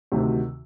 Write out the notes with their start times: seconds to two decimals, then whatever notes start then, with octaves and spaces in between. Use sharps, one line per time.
0.12 D2 C3 D#3 F#3